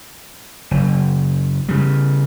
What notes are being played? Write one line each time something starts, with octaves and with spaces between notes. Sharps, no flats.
F#1
C#3 G3